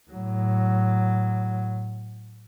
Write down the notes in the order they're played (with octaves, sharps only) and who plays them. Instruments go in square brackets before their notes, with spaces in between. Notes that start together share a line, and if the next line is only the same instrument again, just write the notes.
[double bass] A2 F#3